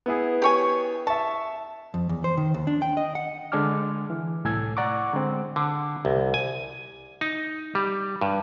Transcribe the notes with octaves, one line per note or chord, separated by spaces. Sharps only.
B3 E4 G#4
G4 C#5 G#5
E5 A5 C#6
F2
E2
C5
D#3
D#2
D4
G5
D#5
F#5
D3 G#3 D4 G#5 D6 F6
E3
C2 A2 A4 G#5 E6 G#6
D5 F#5 A#5 C#6 D6
D3 G#3 C4
D3
C2
G#5
D#4
G3
G2